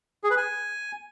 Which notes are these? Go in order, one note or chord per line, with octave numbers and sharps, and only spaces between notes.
G#4
B4
G#5